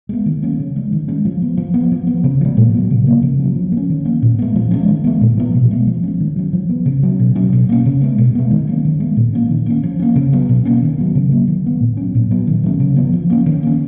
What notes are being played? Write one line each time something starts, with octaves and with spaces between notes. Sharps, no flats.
G#3 B3
D#3
F#3 A#3 C#4
C#3
F3 G#3
D#3
G#3 C#4
F3
B3
F3
B3
F3
B3
C#3
F3 G#3
A#2
F#3 B3
C#3
F3 A#3
C#3
F#3 C#4
F3
A#3
C#4
D#3
F#3 A#3 C#4
A#2
G#3 B3
F3
G#3 C#4
D#3
G#3 B3
A#2
F3 B3
B2
G#3 B3
F3
G#3 C#4
D#3
F#3 C#4
F3
B3
C#3
F#3 C#4
B2
F#3 C#4
B2
A#3 C#4
C#3
G#3 B3
B2
G#3 B3
D#3
F#3 A#3 C#4
D#3
G#3 B3
A#2
F3 A#3 C#4
D#3
A#3 C#4
F3
A#3 C#4
C#3
F#3 B3
B2
A#3 C#4
D#3
F#3 B3
C#3
F#3 A#3
D#3
G#3 B3
A#2
F#3 C#4
A#2
F#3 B3
D#3
F#3 A#3 C#4
C#3
F3 B3
F3
A#3 C#4
D#3
A#3 C#4